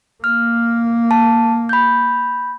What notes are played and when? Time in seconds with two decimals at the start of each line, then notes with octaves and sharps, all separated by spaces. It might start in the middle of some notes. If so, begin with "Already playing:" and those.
0.24 A#3 F6
1.11 A5
1.69 B5 G6